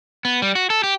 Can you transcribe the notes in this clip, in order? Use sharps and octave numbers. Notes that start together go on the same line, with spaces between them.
B3
G3
F#4
A4
G4